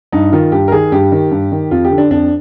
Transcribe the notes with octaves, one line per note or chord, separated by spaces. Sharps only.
G2 D#4
D#3 F4
G2 G4
A#4
D#3 G#4
G2 G4
D#3
G2
D#3
F2 F4
G4
D3
D4
F2 D4